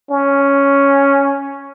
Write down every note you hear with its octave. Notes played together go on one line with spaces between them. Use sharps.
C#4